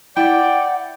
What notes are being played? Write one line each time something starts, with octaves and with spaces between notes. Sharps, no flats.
E4 D5 F#5 G5